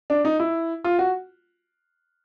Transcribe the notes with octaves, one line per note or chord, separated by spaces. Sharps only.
D4
D#4
E4
F4
F#4